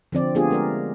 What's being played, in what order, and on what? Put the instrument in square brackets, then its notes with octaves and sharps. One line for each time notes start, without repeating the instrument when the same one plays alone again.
[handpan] D3 F3 C4 D5
A3 B3 D4 F4 G4 G#4
G#3 A#4 D5